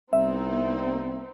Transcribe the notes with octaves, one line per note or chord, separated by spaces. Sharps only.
C2 B3 C4 D#4 E5